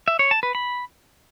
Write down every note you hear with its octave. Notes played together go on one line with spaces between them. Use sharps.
E5
C#5
A5
B4
B5